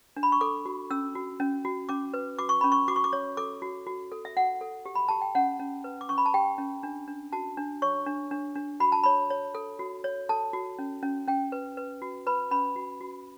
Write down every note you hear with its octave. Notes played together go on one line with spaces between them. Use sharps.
D4
B5
C#6
A4 D6
F#4
C#4 E6
F#4
C#4
F#4
C#4 D6
B4
F#4 D6
C#6
C#4 B5
C#6
F#4 D6
C#6
D6
C#5
A4 D6
F#4
F#4
A4
E5
F#4 F#5
A4
G4
B5
G4 A5
G5
C#4 F#5
C#4
B4
D6
C#4 C#6
B5
A5
G4 G5
C#4
D4
D4
F#4 A5
D4
C#5 C#6
D4
D4
D4
F#4 B5
A5
C#5 B5
C#5
A4
F#4
C#5
A4 A5
F#4
C#4
C#4
C#4 G5
B4
B4
F#4
B4 B5
C#4 B5
F#4
F#4